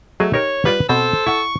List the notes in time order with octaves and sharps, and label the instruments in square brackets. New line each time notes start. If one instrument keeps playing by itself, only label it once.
[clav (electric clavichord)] F#3 G#4 D#5 [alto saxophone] A3
[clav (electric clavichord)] D#4 G4 A#4 [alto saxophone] C#5
[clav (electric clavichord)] G3 F4 D5 [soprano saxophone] B4
[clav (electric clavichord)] B2 C4 [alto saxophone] A4 [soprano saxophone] C5
[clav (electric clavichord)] E4 F#5 [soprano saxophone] C#6